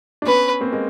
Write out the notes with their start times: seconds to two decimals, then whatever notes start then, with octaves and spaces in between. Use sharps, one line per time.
0.22 D4
0.26 B3 C#4 B4
0.61 A#3 C4
0.72 G#3 A#3